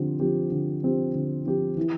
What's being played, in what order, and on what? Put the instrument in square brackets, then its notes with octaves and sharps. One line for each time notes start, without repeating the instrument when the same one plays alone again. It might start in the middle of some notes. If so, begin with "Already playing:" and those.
Already playing: [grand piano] D3 F3 C4 G4
F3 C4 G4
D3
F3 C4 G4
D3
F3 C4 G4
E3